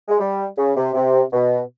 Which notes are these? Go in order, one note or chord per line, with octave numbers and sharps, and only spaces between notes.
G#3
G3
C#3
C3
C3
B2